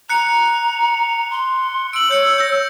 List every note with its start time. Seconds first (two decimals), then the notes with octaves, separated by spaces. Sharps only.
0.09 A#5 F#6 C#7
1.31 C6
1.93 E6 D7 F#7
2.11 C#5 G6 C#7 D7
2.38 G6 A#6